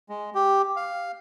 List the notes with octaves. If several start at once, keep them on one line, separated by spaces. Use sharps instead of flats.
G#3
G4
F5